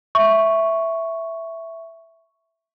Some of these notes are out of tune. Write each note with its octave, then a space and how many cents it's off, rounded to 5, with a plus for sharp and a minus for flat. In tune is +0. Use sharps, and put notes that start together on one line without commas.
E5 +0 C#6 +0